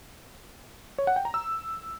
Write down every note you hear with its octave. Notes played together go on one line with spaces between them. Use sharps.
C#5
F#5
G5
A#5
E6